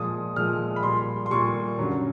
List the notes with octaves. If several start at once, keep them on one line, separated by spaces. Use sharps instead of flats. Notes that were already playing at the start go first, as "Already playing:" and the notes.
Already playing: A#2 F3 G#3 D#6
A#2 F3 G#3 F6
B5
A#2 G3 C6
C6
A#2 G3 C#6
F#2 D3 F#3